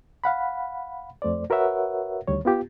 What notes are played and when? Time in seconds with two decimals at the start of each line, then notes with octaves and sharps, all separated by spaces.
0.24 F5 F#5 B5
1.22 F2 A3 C5 D5
1.50 F#4 A#4 B4 C#5 E5 F#5
2.27 D2 D#3 G3 C#5
2.45 B3 F4 G4